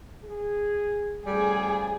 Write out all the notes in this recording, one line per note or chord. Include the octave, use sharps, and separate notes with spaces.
G#4
C#3 F3 G3 A3 G#4